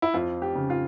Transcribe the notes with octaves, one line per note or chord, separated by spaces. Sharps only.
E4
F2 F4
G4
C#3
F4